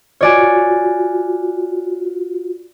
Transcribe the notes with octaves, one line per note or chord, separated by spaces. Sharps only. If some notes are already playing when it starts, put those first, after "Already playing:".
F4 F#4 C#5 D5 G#5